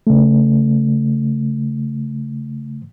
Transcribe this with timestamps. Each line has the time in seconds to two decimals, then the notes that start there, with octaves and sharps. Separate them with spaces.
0.07 C#3 A3